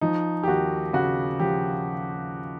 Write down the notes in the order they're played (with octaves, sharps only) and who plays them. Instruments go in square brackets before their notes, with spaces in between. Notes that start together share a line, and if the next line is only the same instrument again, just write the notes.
[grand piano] F3 D#4
G4
D#2 F#4
C#3 F#4
F3 G4